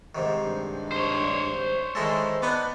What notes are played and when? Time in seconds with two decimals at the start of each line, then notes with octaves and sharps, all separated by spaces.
0.15 G#2 C3 D#3
0.43 G2
0.92 C5 C#5
1.95 D#3 G#3 E4 A4
2.42 B3 D4 D#4 D6